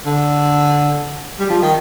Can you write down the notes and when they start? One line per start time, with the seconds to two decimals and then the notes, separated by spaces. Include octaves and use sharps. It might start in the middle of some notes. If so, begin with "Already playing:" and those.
0.06 D3
1.39 G3
1.50 F3
1.62 D#3